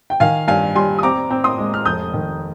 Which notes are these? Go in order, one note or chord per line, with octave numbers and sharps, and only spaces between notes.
G5
D#3 F5 G#5
G2 F5 G#5
G3 G#5 C6
D#6
C4 A#5 D6
C4
C6 D#6
G#3
F6
F1 D#6 G6
D#3